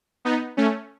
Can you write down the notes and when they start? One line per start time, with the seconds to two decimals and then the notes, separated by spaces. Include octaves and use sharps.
0.25 B3 D#4
0.57 A3 C#4